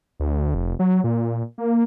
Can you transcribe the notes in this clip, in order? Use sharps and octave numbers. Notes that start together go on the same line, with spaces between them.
D2
F1
F#3
A#2
A#3